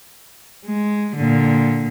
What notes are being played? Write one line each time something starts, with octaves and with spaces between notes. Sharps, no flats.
G#3
A#2 D3